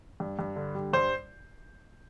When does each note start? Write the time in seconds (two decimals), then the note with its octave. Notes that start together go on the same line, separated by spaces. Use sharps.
0.20 G2
0.39 G2
0.56 D3
0.75 G3
0.93 G2 C5